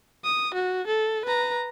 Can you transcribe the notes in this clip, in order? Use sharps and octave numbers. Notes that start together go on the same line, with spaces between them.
D#6
F#4
A4
B4 A#5